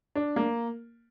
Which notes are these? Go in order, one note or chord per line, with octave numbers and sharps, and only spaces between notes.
D4
A#3